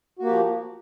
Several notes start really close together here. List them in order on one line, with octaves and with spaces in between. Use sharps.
F#4 A#3 G4 F3